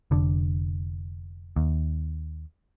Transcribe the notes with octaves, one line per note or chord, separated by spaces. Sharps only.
F1 D3
D#2